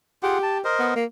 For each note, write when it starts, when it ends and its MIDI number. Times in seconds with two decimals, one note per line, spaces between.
0.23 0.38 65
0.23 0.61 67
0.23 0.38 68
0.23 0.38 78
0.43 0.58 81
0.64 0.94 70
0.64 0.94 72
0.64 0.94 75
0.79 0.91 59
0.96 1.05 58